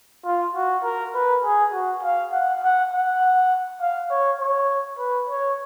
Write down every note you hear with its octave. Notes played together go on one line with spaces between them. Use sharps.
F4
F#4
A#4
B4
G#4
F#4
F5
F#5
F#5
F#5
F5
C#5
C#5
B4
C#5